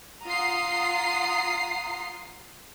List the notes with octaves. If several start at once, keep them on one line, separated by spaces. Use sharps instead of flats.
F4 F#5 A#5 D#6 C7